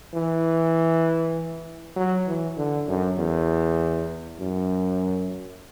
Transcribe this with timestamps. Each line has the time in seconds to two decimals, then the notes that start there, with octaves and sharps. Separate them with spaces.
0.14 E3
1.96 F#3
2.27 E3
2.57 D3
2.88 F#2
3.18 E2
4.39 F#2